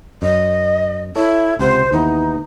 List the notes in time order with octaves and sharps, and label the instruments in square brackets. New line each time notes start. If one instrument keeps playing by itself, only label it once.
[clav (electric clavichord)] F#2 [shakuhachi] D#5
[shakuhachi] E4 [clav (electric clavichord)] A4 C#5 E5
[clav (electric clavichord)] C#2 C3 F#5 [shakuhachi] C5
[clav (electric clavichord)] D#2 E3 B3 [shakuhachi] D#4